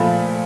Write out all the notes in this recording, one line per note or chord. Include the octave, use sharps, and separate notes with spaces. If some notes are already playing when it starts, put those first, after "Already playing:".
Already playing: A#2 F3 A3 B5